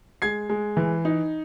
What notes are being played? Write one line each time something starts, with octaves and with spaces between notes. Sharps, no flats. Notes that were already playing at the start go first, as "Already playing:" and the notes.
G#3 G#6 C7
G#3
E3
D#4